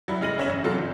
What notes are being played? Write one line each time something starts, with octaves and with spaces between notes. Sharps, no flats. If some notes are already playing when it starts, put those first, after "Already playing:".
F#3 G3 E4
F1 G#3 F6 A#6 D#7 F#7
G1 C#4 C#5 E5 E7 F#7
A1
C3 E3 F#3 F4 A4
G1